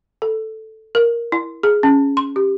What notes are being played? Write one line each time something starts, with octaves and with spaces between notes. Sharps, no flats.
A4
A#4
E4
G#4
C#4
C6
G4